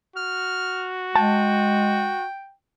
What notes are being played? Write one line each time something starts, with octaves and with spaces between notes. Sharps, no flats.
F#4 F6
G#3 G5 A5